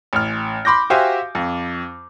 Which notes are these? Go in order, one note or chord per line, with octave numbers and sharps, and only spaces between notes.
A1 F6
B5 C6 D6 G6 A#6
F#4 G4 C5 E5 F5 G#5
F2